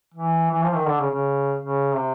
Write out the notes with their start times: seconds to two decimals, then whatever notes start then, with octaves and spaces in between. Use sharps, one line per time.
0.14 E3
0.51 E3
0.63 F3
0.75 D#3
0.87 D3
1.00 C#3
1.11 C#3
1.59 C#3
1.95 C3